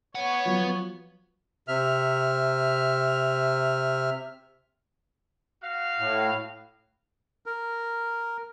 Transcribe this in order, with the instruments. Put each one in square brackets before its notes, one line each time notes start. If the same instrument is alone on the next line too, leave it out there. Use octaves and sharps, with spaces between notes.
[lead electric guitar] B4 F#5 [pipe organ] C#5
[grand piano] F3 F#3
[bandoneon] C3 E5 F6
[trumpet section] F#4 F5
[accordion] A2
[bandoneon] A#4